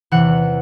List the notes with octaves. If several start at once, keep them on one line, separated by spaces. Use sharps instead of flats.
E2 C3 E3 F#5